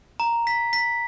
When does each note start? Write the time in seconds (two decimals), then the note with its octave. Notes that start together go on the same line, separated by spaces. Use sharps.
0.20 A#5
0.47 B6
0.73 B6